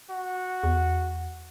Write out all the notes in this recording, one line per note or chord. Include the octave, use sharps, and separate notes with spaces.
F#4
E2